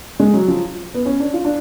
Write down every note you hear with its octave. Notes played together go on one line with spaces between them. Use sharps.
G#3
F#3
F3
B3
C#4
D4
F4
D4